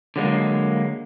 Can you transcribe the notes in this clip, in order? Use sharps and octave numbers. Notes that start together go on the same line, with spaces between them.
D3 F#3 G#3 A#3